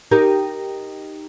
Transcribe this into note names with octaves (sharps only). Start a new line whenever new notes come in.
D#4 G4 A#4